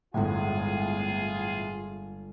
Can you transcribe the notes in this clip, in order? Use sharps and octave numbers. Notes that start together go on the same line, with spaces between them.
G1 E2 A2 G#3 F4 G#4 G#5